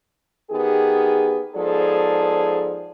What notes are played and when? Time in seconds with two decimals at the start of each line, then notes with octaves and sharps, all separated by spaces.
0.50 D#3 B3 G4 G#4
1.55 G#2 F3 B3 G#4 A4 D5